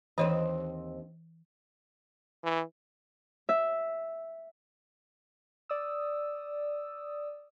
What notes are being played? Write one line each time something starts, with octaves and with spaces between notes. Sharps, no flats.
D#2 E3 C4 C#5 D#5
E3
E5
D5 D#6 E6